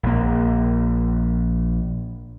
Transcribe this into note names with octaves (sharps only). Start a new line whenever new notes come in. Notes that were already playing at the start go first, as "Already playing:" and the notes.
A#1 A#3